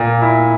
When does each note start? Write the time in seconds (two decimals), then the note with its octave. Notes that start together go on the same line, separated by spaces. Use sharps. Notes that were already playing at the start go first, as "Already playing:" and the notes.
Already playing: A#2 A#3
0.22 E4